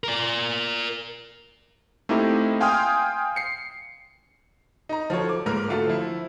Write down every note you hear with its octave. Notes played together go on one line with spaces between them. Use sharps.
A#4 D5
A3 A#3 C4 D#4 E4 G4
F5 G5 G#5 C6 D#6 F6
C7 C#7
D#4 A#5
F3 F#4 A4 C#5
D6
G#2 A#3 A#4 B4 F6
D3 A3 F4 F#4 A4
F3 E4